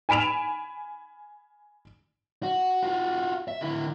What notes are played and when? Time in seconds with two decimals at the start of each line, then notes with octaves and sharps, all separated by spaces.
0.09 G#5 B5 D7 E7 F7
2.43 F#4
2.83 F4 F#4
3.48 E5
3.61 D3 E4